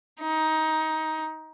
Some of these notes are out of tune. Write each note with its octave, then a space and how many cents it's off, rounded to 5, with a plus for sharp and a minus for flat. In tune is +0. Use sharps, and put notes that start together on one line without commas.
D#4 +15